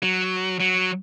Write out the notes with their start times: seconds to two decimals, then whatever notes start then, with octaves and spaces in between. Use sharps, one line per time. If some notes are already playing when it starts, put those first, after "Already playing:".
0.03 F#3
0.60 F#3